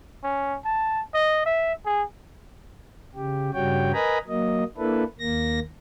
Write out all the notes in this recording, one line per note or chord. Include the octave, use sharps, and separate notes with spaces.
C#4
A5
D#5
E5
G#4
C#3 G4
G2 C#3 G3 F#4 C#5 G5
A#4 B4 D#5 G#5 A#5 B5
F#3 A#3 D#5
A#3 D4 E4 A4 B4
D#2 A#3 A#6